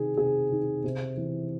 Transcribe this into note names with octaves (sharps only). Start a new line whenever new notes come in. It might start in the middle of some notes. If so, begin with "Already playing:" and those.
Already playing: C3 D#3 G#4
C3 G#4
D#3
C3
E3